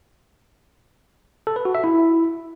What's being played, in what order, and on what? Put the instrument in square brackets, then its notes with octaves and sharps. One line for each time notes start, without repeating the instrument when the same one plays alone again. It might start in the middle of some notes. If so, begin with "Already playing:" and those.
[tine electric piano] A4
B4
F#4
E5
E4